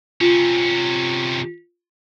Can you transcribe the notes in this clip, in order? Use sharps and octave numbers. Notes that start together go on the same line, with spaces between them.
C3 C#4 F4